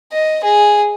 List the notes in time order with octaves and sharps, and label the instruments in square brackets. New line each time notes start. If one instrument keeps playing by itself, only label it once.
[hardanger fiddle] D#5
G#4